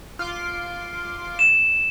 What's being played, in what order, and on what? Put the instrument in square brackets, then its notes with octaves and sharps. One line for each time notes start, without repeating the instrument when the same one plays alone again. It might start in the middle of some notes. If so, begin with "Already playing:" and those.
[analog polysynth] F4 C6 D6
[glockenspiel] E7